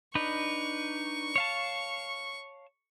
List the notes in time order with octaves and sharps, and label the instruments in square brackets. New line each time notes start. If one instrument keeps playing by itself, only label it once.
[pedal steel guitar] D4 D#4 B4 [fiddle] C#6
[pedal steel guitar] C#5 F5 A5